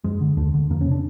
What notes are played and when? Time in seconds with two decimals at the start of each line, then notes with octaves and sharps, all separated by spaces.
0.04 F#2 G#3
0.21 D3
0.37 D#2 A3
0.54 D3
0.70 F2 A#3
0.81 C#4
0.86 C3
0.91 D4